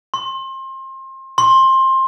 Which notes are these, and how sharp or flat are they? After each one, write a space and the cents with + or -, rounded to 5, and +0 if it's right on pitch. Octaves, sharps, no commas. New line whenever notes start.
C6 +30
C6 +20